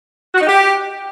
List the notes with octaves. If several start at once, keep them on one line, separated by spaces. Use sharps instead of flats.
F#4
D#4
G4